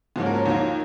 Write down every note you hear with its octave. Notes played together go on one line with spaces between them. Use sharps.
G#2 F3 A#3 C#4 F#4
A#4
C#5
D#2 D#3 A#3 F4